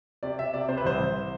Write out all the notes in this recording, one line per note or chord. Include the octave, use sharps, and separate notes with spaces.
C3 D5
C3 E5
C3 D5
C3 C5
B4
C2 C5
C2